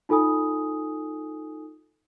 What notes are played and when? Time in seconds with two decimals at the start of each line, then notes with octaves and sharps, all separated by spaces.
0.09 D#4 F4 A4 G#5 D#6